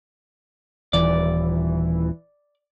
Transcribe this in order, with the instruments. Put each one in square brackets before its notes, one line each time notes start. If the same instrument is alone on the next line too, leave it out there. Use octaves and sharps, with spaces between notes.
[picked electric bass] D#1 [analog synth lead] E3 [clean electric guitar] D5